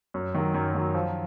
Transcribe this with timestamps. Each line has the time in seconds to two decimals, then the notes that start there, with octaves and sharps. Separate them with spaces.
0.14 F#2
0.34 D#3 F#3
0.54 F#2
0.75 D#3 F#3
0.94 F3